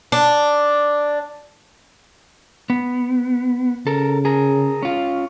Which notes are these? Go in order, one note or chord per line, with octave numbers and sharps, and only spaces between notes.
D4
B3
C#3 A4 A#4
G#4 A#4
C#4 F4